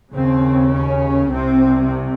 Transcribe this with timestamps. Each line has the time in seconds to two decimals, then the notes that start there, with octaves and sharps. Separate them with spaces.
0.13 D#2 C#3 C4
0.72 C#4
1.29 C2 C3 C4